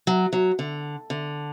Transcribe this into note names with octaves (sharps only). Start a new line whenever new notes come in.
F#3
F#3
D3
D3